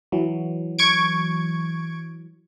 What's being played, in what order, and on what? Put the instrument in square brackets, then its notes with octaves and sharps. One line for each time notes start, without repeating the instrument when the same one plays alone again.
[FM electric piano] E3 F#3
[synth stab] C#6 G#6 D7